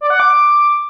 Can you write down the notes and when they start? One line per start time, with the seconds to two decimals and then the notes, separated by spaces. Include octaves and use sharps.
0.01 D5
0.10 F#5
0.20 D6